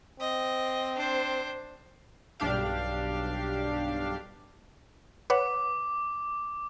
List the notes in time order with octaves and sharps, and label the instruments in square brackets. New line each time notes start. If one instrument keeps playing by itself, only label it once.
[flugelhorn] C4 [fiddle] D#5
[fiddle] D4 C5
[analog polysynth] B1 G2 D4 G4 F5
[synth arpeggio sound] B4 C#5 F#5 [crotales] D6